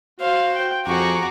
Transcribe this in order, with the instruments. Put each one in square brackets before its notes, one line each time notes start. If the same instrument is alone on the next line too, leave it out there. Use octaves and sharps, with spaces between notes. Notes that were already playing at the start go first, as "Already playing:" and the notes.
[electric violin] F#4 [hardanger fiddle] C5 [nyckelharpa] F5
[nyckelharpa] G5
[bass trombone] F2 [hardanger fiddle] F#4 G#4 [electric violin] A#5 D6 [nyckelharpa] C#6